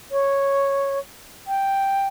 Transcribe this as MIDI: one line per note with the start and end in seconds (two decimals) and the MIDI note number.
0.11 0.98 73
1.47 2.07 79